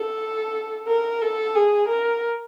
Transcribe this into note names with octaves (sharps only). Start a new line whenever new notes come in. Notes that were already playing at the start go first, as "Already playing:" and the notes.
Already playing: A4
A#4
A4
G#4
A#4